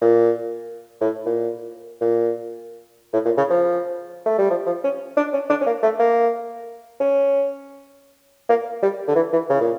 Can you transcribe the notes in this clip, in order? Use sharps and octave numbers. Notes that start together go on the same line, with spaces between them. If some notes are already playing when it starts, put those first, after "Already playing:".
A#2
A2
A#2
A#2
A2
A#2
C#3
F3
A3
G3
F3
F3
C#4
D4
C#4
D4
C#4
A#3
A3
A#3
C#4
A#3
G3
D3
E3
E3
C#3
A#2